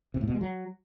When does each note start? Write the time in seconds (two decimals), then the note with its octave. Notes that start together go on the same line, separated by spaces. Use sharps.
0.14 C3
0.21 A2
0.28 B2
0.34 G#3
0.41 F#3